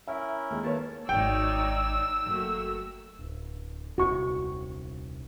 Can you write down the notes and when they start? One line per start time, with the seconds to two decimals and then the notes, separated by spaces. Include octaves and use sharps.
0.07 C#4 E4 A#4 E5
0.50 D#2 G#3
0.64 A3 A#3 B4 C#5 A5
1.09 D#1 G#1 D#4 C#5 D5 G5 E6
2.26 F#1 A3 A#3 F#4
3.19 D1
3.98 D#1 C2 F#4 C#6